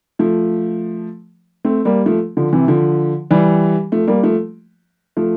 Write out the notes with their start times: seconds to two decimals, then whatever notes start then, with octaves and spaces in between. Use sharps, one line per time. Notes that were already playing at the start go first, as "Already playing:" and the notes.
0.19 F3 A3
1.65 A3 C4
1.85 G3 A#3
2.06 F3 A3
2.37 D3 F3
2.53 C3 E3
2.68 D3 F3
3.31 E3 G3
3.92 F3 A3
4.07 G3 A#3
4.23 F3 A3
5.17 F3 A3